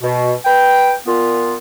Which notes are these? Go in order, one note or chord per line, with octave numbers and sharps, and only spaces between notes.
B2
B4 G5
A#2 B3 F4